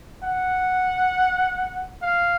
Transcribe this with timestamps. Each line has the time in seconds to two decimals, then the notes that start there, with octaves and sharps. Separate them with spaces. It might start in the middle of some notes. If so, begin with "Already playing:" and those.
0.24 F#5
2.02 F5